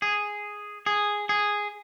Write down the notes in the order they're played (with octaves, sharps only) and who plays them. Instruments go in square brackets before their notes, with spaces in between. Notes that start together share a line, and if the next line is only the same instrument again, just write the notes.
[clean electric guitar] G#4
G#4
G#4